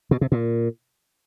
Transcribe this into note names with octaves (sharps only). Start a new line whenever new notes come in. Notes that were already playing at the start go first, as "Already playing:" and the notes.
B2
C3
A#2